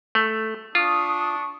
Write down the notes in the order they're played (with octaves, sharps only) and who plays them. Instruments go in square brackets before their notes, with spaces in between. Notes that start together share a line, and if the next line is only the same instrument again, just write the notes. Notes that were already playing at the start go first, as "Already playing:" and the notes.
[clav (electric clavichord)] A3
[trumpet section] D4 C#6 [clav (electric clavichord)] F4 [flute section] D#6